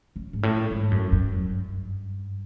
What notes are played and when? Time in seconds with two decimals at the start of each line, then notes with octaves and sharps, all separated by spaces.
0.16 C#3
0.33 G#2
0.43 A2
0.70 G#2
0.91 F#2
1.12 F#2
1.33 G2